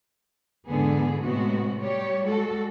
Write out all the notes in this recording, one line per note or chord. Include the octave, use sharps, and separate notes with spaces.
E2 G#2 D3 B3 G#4
A2 C3 G#3 B3 C4 F#4
G3 G4 C#5
G3 G#3 F#4 A4